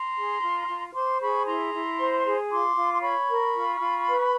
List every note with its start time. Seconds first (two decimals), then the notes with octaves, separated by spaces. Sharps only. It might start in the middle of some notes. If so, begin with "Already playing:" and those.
Already playing: A#5 C6
0.17 G#4
0.42 F4
0.68 F4
0.94 C5 C6 D6
1.20 G#4 B5 C#6
1.46 E4 A#5 C6
1.73 E4
1.99 C5
2.24 G#4
2.50 F4 C6 D6
2.76 F4
2.94 C6
3.02 C#5 B5 C#6
3.28 A#4
3.54 F4
3.80 F4
4.07 B4